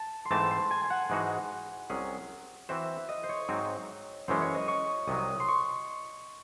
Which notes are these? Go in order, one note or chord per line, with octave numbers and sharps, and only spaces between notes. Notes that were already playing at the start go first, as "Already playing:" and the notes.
Already playing: A5
C6
G#2 E3 A3 C4 A5
C6
G#5
G#5
F#5
G#2 E3 G#3 D#4 F#4
C2 C3 F#3 C#4 G#4
E3 C4 F#4 C5 E5
D#5
C5
C#5
G#2 F#3 C4 D#4
F#2 E3 G#3 C#4 C5
C#5
D#5
C#6
C2 C3 F#3 D#6
C6
C#6